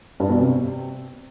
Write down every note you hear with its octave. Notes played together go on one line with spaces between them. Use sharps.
G2
B2
C3